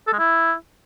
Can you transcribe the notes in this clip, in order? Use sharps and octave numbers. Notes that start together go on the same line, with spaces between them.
A4
G#3
E4